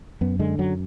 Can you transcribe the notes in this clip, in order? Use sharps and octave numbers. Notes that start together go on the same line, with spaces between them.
F#2 B3
D3 G#3
F#2 F#3